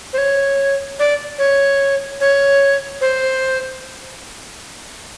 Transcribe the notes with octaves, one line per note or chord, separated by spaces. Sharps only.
C5
C#5
D5
C#5
C#5
C5